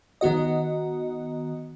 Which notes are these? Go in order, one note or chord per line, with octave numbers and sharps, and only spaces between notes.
D#3 B3 F#4 D#5